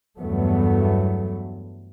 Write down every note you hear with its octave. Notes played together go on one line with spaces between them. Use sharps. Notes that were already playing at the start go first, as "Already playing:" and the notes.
E2 G2 F#3 A3 B3